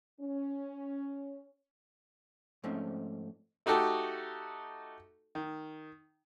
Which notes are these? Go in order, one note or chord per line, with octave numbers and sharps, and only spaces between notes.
C#4
G#2 F3 A3 C4 C#4 D#4
A3 D#4 F#4 G4 A4
D#3